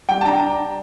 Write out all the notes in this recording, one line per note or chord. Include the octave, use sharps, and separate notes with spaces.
G3 G5
A5
D4 A#5